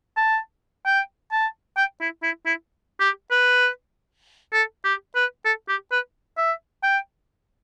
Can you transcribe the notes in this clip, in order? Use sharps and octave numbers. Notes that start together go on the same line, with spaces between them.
A5
G5
A5
G5
E4
E4
E4
G4
B4
A4
G4
B4
A4
G4
B4
E5
G5